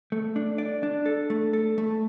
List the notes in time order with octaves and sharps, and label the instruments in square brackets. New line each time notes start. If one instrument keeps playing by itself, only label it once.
[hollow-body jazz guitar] A3
D4
D5
D4
A4
A3
A4
A3